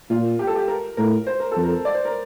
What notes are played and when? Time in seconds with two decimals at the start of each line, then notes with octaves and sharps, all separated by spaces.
0.10 A#2 F4
0.39 G4
0.47 A4
0.56 G4
0.68 A#4
0.97 A2 A#4
1.27 C5
1.40 A#4
1.52 F2 A4
1.64 A#4
1.85 D5
1.94 C5
2.05 A#4